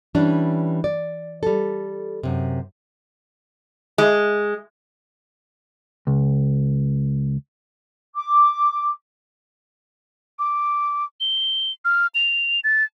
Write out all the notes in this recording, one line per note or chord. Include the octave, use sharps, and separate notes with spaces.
E3 G3 C#4 D4
D5
G3 A4
F#2 C3
G#3
C#2
D6
D6
G7
F6
F7
A6